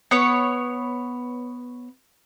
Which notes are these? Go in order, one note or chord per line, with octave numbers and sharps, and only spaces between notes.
B3 C#5